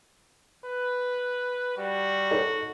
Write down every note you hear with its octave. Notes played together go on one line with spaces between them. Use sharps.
B4
G3 F#4
D#4 A4 C#5